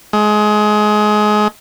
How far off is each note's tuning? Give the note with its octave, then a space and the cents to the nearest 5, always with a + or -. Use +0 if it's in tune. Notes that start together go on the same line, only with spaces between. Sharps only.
G#3 +25